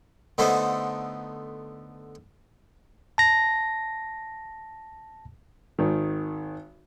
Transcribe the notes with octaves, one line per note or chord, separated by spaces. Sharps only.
D3 A3 B3 D#4 C5
A5 A#6
G#1 D#3